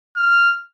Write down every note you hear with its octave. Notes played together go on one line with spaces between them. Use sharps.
F6